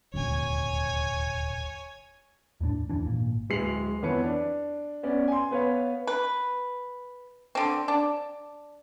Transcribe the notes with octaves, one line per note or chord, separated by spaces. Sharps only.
D#1 G#1 D2 C#5 G#5
E2 A2 B3 D4
D1 F2 E3 D4
G#1 A#2
D1 G#3 B4 C7 F7 F#7
F2 E3 B3 B4 C#5 C#7
D4
B3 C#4 D5
G#5 C6
B3 B4 C#5 F5
B4
D3 C4
D4